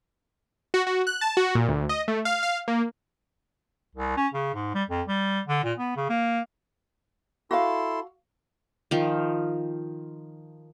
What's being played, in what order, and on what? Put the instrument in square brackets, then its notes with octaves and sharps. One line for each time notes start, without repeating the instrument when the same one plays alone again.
[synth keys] F#4
F#4
F#6
A5
F#4
A#2
D2
D#5
A3
F5
F5
A#3
[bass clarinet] C2
C#4
C#3
G#2
G3
F2
G3
D3
A#2
B3
C#3
A#3
[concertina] E4 A4 C6 [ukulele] F#4 F5
[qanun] D#3 F3